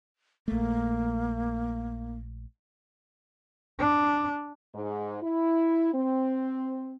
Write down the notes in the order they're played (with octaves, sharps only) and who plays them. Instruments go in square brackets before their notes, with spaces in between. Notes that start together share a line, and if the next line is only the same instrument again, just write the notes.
[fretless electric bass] A#1 A3 [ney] A#3
[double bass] D4
[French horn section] G#2
E4
C4